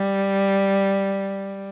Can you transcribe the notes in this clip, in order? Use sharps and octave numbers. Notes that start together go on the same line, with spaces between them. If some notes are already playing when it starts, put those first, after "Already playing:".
Already playing: G3